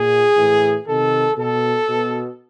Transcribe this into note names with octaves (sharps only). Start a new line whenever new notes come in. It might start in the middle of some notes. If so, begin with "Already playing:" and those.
Already playing: A#2 G#4
A2 E3
C3 D#3 A4
B2 A4
B2